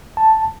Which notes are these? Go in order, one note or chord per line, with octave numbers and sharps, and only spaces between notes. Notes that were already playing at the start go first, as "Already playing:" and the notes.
A5